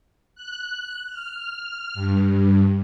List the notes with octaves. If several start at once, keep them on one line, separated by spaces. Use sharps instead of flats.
F#6
F6
G2